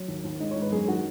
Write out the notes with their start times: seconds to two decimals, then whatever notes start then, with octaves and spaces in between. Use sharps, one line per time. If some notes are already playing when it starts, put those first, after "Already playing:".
Already playing: F#3 C#5
0.08 D#2
0.24 D#2
0.40 G#2 D#5
0.51 C#5
0.56 G#2
0.61 B4
0.72 F#2 G#4
0.88 D#3 F#4